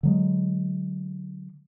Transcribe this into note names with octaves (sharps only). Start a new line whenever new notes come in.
D3 F#3 G#3